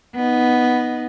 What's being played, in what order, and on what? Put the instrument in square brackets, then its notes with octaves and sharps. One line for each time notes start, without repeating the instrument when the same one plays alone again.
[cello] B3 D#4